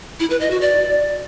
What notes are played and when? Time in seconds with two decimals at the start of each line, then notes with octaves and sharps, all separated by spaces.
0.20 E4
0.30 B4
0.40 D#5
0.51 F#4
0.61 D5